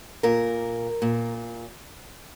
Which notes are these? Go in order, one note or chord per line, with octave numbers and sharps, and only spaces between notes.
A#2 A#4
A#2